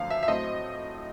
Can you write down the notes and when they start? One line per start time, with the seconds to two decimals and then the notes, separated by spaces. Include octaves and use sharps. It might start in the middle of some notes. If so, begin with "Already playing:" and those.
Already playing: F#2 D3 F3 A3 F5
0.11 E5
0.23 E5
0.28 A2 F#3 A3 C4 D#5